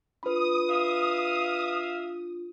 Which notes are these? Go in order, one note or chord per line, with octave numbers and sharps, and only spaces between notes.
D4 F4 B4 B5 D#6
E5 F5